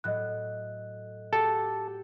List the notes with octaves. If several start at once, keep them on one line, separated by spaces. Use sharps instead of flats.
A2 F#3 D#5 F#6
F#4 G4 A4